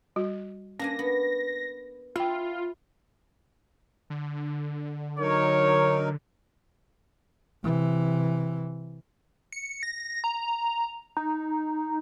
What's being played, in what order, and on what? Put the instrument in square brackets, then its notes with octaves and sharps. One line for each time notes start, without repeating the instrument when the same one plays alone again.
[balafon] G3 F#4
[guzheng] A#3 D4 G#5 [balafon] C#4 [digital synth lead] A#6
[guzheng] B3
[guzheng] E4 [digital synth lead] F4 [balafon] F5 G5
[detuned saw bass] D3
[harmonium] F#3 D#4 A#4 [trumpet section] C#5
[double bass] C3 E3
[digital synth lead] C#7
A#6
A#5
D#4